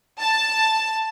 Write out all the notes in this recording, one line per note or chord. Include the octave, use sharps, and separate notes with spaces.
A5